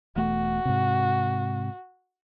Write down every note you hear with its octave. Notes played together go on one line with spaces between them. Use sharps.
E1 E2 A3 F#4
G#2 C3